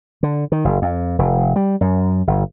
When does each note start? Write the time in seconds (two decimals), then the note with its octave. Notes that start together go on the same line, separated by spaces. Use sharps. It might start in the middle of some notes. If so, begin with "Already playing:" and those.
0.23 D3
0.52 D#3
0.65 F#1
0.82 F2
1.19 F1
1.56 G3
1.81 F#2
2.27 G1